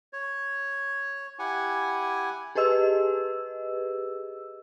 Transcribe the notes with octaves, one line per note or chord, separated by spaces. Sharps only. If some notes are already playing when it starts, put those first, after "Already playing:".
C#5
E4 G4 F#5 G#5
G4 G#4 B4 D#5 E6